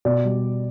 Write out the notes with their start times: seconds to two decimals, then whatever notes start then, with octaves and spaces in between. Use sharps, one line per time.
0.05 B2 D5
0.24 G3